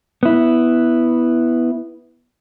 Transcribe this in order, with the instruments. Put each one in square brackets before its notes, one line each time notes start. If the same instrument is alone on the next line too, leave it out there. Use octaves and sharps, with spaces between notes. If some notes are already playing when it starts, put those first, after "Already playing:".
[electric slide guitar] B3 E4